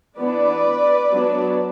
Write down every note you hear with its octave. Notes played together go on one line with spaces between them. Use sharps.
E3 B3 D4 B4 D5
F#3 B3 D4